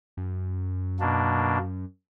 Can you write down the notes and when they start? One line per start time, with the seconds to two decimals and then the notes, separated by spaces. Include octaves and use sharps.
0.17 F#2
1.00 B2 A#3 D4